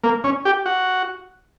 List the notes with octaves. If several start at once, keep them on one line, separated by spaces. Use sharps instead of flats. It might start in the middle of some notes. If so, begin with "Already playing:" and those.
A#3
C#4
G4
F#4